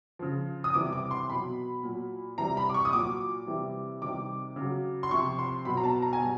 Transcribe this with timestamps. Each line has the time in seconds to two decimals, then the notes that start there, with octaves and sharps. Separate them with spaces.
0.19 C#3 F3
0.64 D#6
0.74 C3 E3 G3 D6
0.93 D6
1.11 C6
1.30 B2 F#3 B5
1.83 A#2 F#3
2.38 C3 E3 G3 A#5
2.57 B5
2.69 D6
2.74 C#6
2.85 D#6
2.93 A#2 F#3 D6
3.47 C3 E3 G3
4.02 C3 D#3 G3 D6
4.56 C#3 F#3
5.03 C6
5.11 C3 F3 C#6
5.39 C6
5.65 B2 F#3 B5
5.77 A#5
5.84 A5
6.02 A#5
6.13 G#5
6.20 B2 G3 A5